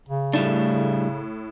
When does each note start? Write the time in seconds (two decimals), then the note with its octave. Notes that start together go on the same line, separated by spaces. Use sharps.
0.09 C#3
0.33 A2 G3 A3 D4 E7